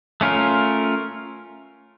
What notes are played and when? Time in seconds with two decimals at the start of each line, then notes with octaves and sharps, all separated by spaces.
0.21 A3 C#4 F4 A#4